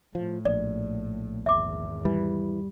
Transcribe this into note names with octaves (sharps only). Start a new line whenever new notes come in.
A2 F3
A#1 D5
G#1 E2 E5 D6
E3 G3